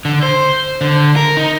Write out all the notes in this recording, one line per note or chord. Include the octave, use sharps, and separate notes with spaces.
D3
C5
D3
A#4
D#4